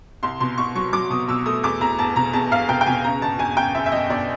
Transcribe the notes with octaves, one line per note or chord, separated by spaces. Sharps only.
C2 C6
B2 C6
C2 C#6
F#3 C#6
F#3 D6
B2 D#6
B2 E6
A3 D#6
E2 D6
E2 A#5
E1 A5
B2 A#5
E2 A5
E1 F5
B2 G5
G5
B2 G#5
C#3 A#5
G1 A5
G1 G#5
C#3 G5
F#2 E5
E5
F#2 D#5
G1 D5